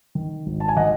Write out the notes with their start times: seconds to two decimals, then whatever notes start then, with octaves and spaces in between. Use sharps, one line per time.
0.15 D#3
0.46 G#1
0.60 A5
0.69 G#5
0.77 D#3 D#5 F#5